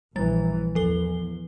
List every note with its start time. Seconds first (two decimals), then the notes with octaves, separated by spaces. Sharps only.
0.16 A#1 E3 G3 A6
0.75 E2 F3 A4 G7